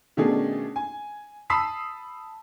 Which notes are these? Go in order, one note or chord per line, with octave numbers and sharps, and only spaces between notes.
B2 D#3 A3 C#4 D4 G#4
G#5
A5 B5 D#6 E6 B6 C7